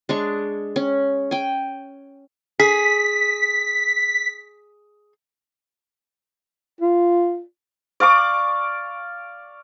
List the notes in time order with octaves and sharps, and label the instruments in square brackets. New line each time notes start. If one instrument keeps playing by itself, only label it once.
[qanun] G#3 D4 C#6
C#4
G5 G#5
[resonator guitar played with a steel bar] G#4 [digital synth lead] B6
[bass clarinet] F4
[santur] D5 F5 C#6 D6